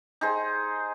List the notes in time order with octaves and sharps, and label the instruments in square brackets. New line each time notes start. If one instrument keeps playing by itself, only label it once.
[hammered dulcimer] D#4 G#4 C5